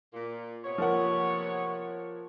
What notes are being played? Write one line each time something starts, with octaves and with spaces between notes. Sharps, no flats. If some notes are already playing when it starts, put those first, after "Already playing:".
A#2
C3 B3 C#5
F3 A#3 F#5